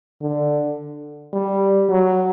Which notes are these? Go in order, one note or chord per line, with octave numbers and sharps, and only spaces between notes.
D3
G3
F#3